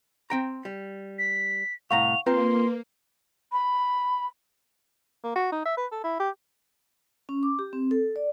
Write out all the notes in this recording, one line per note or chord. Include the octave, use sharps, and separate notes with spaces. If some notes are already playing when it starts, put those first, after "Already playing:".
C4 G5 A#5
G3
B6
C2 A2 F5 F#5 A#5 C#6 F7
A#3 C4 F4 B4 A#5 C6
B5
A#3
F#4
D#4
E5
B4
A4
E4
G4
C#4
D6
G4
C4
A4
D5